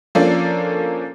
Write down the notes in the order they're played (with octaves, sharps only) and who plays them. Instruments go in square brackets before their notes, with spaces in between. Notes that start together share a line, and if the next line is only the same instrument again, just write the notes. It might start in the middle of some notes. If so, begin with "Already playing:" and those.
[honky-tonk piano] F3 A#3 C#4 D4 A4 D5